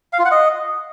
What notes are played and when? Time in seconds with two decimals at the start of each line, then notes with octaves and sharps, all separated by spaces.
0.13 F5
0.19 F4
0.25 F#5
0.31 D#5